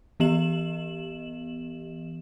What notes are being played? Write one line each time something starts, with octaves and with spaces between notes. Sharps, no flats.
E3 B3 G4 D#5 E7 F#7